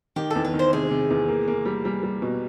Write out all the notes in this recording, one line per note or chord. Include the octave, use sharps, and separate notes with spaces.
D#3 G4
E2 A4
B4
D#3
C5
C3 G#4
C3
E2
A#3
A#3
G3
G3
G3
B2